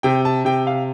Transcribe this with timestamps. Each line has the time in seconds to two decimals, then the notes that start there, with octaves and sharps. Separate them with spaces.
0.03 C3 G5
0.25 A5
0.45 C3 G5
0.67 F5